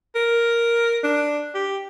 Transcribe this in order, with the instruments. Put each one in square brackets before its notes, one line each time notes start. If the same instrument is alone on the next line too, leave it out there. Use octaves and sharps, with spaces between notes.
[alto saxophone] A#4
D4
G4